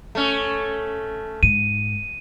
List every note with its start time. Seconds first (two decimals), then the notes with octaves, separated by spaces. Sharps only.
0.15 A3 C#4
1.43 G#2 D#7